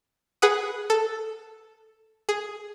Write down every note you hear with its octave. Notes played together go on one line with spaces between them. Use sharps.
G#4 B4 F#5 D#6
A4
G#4